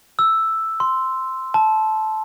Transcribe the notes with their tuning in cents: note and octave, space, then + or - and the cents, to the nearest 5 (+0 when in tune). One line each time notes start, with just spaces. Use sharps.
E6 +0
C6 -5
A5 -15